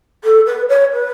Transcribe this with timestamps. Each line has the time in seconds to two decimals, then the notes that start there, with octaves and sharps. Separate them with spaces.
0.24 A4
0.46 B4
0.69 C#5
0.92 B4